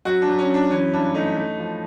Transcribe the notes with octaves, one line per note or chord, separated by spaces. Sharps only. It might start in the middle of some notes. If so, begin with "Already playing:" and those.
F#2 F#4
D4
F#2
C#4
F#2 D4
E3 C#4
G2 D4
A3 D#4
A3
F3